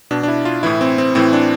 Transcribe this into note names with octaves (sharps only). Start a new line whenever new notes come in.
B2 D4
D4
E4
F4
A2 E3 E4
C4
C4
A2 E3 C4
D4